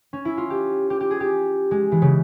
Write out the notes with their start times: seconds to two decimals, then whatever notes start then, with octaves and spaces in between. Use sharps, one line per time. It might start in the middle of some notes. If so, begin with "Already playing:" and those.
0.13 C#4
0.25 E4
0.37 F4
0.50 G4
0.90 G4
1.00 G4
1.11 G#4
1.20 G4
1.71 G#3
1.92 E3
2.02 C#3